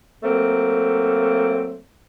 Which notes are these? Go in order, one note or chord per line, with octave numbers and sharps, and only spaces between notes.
F#3 A3 A#3 C4